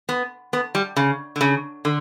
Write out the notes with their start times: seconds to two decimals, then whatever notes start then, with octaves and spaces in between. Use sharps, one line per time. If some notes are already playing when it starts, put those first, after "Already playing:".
0.09 B3
0.53 B3
0.75 G3
0.96 C#3
1.36 D3
1.41 C#3
1.85 D3